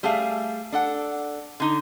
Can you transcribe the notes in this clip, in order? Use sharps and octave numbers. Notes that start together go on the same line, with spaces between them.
G3 A3 G#4 E5 F5
D4 A4 F#5
D3 D#4